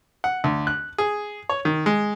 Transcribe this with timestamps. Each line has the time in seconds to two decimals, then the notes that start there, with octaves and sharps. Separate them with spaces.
0.24 F#5
0.44 D2
0.67 F#6
0.98 G#4
1.49 C#5
1.65 D#3
1.86 G#3